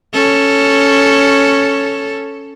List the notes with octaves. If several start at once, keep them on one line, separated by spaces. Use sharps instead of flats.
C#4 A4